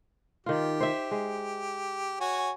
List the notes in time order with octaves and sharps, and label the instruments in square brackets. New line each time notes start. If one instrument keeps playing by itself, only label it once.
[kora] D#3 F4 [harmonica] G4
[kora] C5 E5
G#3
[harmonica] F#4 C#5 G#5